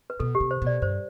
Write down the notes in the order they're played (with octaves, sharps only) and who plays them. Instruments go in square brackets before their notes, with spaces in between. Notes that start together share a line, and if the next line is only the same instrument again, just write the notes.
[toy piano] B4
[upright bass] B2 [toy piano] A4
[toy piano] G4
[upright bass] C3
[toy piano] C5
[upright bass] B2 [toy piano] D5
[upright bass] G2 [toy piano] C5